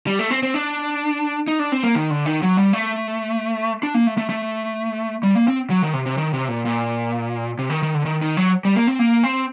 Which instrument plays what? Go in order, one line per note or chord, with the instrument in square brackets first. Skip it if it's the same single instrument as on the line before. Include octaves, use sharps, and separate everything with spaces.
[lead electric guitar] G3
A3
C4
C4
D4
D#4
D4
C4
A#3
D#3
D3
D#3
F#3
G3
A3
D4
A#3
A3
A3
A3
G3
A#3
C4
F#3
D#3
C3
C3
D#3
C3
A#2
A#2
C3
D#3
D#3
D3
D#3
D#3
F#3
G3
A#3
C4
A#3
C4